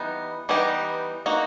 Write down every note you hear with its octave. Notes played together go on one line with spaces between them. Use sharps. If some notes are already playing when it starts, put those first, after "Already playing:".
Already playing: E3 G3 B3 D#4
E3 G3 B3 D#4 G4
A#3 D#4 F#4